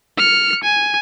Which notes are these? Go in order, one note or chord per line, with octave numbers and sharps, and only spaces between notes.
F6 C#7
G#5